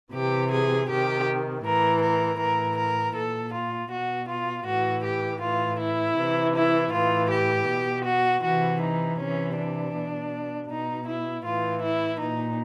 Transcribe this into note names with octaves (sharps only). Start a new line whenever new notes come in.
C3 E3 G4
G#4
C3 D#3 G4
A2 E3 A#4
A#4
A2 E3 A#4
A#4
A#2 A4
F4
B2 F#4
F4
A2 E3 F#4
G4
A2 E3 F4
E4
C3 E3
E4
A2 E3 F4
G4
B2
F#4
C3 E3 F#4
D#4
C3 E3 C#4
D4
B2
B2 D#4
E4
A2 E3 F4
E4
A#2 D#4